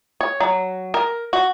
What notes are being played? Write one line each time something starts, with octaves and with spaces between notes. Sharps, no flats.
C#5
F#3
A#4
F#4